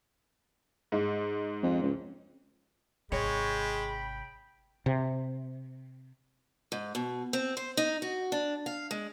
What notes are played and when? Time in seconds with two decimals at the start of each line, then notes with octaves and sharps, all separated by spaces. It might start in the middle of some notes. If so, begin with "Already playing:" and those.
0.92 G#2
1.63 F2
1.83 C#2
3.12 G#1 C3 G#3 C#5 G5 B5
4.86 C3
6.72 G#2
6.95 B2
7.33 C4
7.57 C5
7.77 D#4
8.02 F#4
8.32 D4
8.66 F5
8.91 G#3